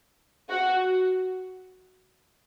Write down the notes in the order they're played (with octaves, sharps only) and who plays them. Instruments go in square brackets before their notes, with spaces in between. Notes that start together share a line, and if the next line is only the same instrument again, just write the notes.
[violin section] F#4